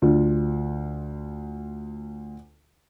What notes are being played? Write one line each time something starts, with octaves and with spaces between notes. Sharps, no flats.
D2 F4